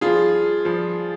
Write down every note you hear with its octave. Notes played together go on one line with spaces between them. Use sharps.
G2 F3 F4 G#4
G2 F3